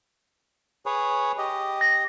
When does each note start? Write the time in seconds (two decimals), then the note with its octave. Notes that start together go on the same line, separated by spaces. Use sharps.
0.86 G#4 B4 C#5
1.38 G4 D#5
1.81 A#6